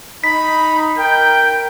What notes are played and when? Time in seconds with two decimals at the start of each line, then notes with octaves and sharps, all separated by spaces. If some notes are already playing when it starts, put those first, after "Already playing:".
0.24 D#4 B5 B6
0.98 A#4 G5 G6